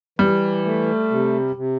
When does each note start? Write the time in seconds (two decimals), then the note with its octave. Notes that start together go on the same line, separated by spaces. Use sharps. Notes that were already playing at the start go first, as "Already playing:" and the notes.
0.19 E3 G3
0.65 A3
1.10 C3
1.56 C3